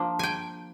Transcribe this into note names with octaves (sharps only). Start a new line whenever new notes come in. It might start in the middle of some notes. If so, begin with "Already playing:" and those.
Already playing: F3 A#3 D4
G5 G#5